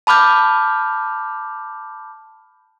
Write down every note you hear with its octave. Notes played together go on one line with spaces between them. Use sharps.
A5 B5 D6 F6 G6